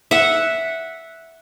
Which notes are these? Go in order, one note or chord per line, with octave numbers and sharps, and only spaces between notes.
E5 F#5